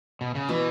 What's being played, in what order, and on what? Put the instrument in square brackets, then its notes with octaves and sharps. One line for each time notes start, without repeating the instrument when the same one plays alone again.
[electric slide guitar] B2
C#3
[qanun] B2 [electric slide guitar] E3